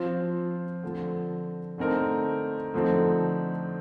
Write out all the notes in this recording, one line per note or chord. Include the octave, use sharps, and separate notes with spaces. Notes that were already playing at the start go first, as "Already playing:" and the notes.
Already playing: F3 C4 F4 C5
D3 F3 C4
D3 A3 C4 D#4 A#4
D3 F3 A3 C4 D#4